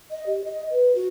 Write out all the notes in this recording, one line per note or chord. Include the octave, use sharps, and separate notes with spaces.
D#5
G4
D#5
B4
F#4